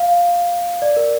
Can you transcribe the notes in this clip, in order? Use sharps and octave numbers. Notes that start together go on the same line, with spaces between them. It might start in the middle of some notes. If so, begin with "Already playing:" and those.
Already playing: F5
D5
A#4